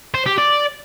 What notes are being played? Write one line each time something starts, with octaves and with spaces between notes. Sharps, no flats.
C5
G4
D5